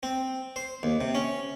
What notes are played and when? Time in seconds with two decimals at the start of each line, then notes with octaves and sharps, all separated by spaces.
0.03 C4
0.56 C5
0.83 D#2
1.01 C3
1.15 C#4